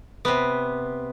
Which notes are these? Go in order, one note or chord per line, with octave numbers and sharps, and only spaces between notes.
C3 B3